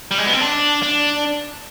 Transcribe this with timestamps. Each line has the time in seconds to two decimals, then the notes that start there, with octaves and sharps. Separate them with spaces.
0.11 G3
0.18 G#3
0.26 B3
0.33 C4
0.41 D4
0.83 D4